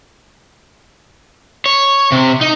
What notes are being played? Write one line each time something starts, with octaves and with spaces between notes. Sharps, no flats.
C#5
C3
D#4